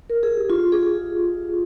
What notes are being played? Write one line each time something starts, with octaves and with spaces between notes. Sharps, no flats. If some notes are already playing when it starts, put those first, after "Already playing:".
A#4
G#4
G4
F4
G#4